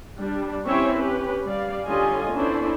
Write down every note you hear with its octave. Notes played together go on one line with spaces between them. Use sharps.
G3 D4
C4 C#4 E4 G4 C#5 E5
C#4 G4 B4
G3 D5 F5
D3 G3 C#4 F4 D#5 G#5
B3 C#4 D4 E4 A4 C5